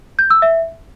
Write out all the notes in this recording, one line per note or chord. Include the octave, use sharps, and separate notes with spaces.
G6
E6
E5